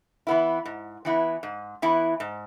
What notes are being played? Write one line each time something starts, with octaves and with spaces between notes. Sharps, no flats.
E3 B3 E4
G#2
E3 B3 E4
G#2
E3 B3 E4
G#2